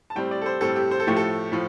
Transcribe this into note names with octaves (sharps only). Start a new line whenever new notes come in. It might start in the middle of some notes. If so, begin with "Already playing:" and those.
A5
A2 G3 C4 G5
D5
A4
C5
A2 G3 C4 A4
G4
C5
A4
A2 F3 A3 G4
A4
A2 F3